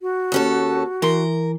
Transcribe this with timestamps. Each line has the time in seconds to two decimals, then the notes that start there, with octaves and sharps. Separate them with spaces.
0.01 F#4
0.32 D#2 C#4 A4
1.02 E3 A#4 C6